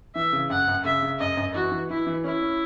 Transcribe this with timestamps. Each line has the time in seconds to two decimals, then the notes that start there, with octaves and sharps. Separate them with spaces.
0.15 E3 E5
0.33 C#3
0.50 F#2 F#5
0.68 F#2
0.85 C#3 E5
1.02 C#3
1.20 F#2 D#5
1.37 F#2
1.55 E3 F#4
1.72 E3
1.90 E3 E4
2.07 E3
2.24 C#4 E4
2.42 C#4